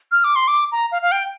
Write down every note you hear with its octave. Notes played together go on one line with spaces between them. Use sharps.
F6
D6
C6
D6
A#5
F5
F5
G5